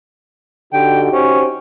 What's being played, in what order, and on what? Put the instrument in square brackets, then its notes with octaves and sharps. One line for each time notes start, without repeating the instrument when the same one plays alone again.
[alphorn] D3 [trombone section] D#4 F#4 G4 [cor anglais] G5
[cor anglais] C#4 [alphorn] C5